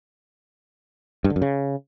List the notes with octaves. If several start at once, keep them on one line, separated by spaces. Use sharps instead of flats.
G2
D3
F#2
C#3